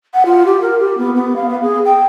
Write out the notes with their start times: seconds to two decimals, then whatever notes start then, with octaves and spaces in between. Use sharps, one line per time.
0.14 F#5
0.25 F4
0.46 G4
0.61 A#4
0.79 G4
0.98 B3
1.15 B3
1.36 F5
1.49 B3
1.62 G#4
1.85 G5